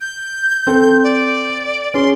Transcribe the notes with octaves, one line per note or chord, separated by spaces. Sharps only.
G6
C4 A4
D5
C#4 G#4 C6